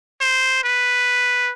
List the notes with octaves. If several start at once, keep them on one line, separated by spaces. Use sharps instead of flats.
C5
B4